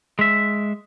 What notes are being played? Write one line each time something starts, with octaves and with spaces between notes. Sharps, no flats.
G#3 E5